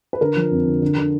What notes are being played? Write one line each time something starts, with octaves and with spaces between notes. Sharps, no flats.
B4
D3 A#4
F3
F2
D3
D3
D3